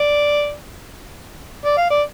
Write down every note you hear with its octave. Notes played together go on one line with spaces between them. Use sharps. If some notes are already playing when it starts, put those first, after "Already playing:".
Already playing: D5
D5
F5
D5